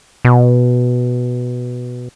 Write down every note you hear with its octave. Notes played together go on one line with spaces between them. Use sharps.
B2